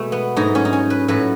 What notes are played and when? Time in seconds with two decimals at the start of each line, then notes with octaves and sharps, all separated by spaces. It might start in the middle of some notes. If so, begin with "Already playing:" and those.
Already playing: B2 G#3 A3
0.12 B3
0.36 G#2 F#3 A3 D#4
0.55 C#4
0.65 D#4
0.73 C#4
0.90 B4
1.08 A2 F#3 A3 B4